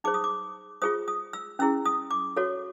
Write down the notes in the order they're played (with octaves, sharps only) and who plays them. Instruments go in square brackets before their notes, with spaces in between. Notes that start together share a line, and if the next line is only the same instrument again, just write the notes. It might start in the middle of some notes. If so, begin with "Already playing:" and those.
[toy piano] D#4 G#4 C5 D6
D#6
D6
F4 G#4 C5 D#6
D#6
E6
C#4 E4 G#4 E6
D#6
D6
F#4 A4 C#5